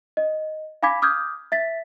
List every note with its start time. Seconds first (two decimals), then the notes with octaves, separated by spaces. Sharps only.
0.17 D#5
0.83 F5 G#5 B5 D6 G#6 B6
1.02 D6 D#6 F6 G6 G#6
1.52 E5 A6 B6